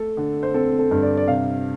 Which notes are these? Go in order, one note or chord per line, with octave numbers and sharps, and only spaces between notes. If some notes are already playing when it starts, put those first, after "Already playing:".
Already playing: A3 A4
D3
C5
C4 A4
A4
G2
D5
D5
C3 F5